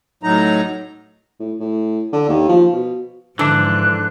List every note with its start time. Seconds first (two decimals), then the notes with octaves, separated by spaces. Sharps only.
0.23 A2 F#3 D#4 A#5
1.40 A2
1.60 A2
2.13 D3
2.29 D#2
2.49 F3
2.73 B2
3.39 G#2 D3 E3 F3 D4 F#6